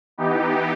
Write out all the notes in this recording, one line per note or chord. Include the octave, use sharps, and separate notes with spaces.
E3 B3 D#4 G4